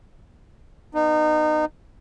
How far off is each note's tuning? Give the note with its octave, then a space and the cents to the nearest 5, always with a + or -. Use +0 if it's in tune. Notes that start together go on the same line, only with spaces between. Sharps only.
B3 +0 D#4 -25